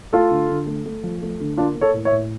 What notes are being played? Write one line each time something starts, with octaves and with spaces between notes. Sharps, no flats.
A3 F4 A4
D3
D3
A3
A3
F3
A3
D3
A#3 D4 F4
A#3
A4 C#5
A2
C#5 E5
A2